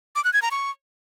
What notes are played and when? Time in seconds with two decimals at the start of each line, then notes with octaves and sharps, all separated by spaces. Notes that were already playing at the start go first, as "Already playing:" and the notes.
0.16 D6
0.24 F#6
0.33 G#6
0.42 A#5
0.51 C#6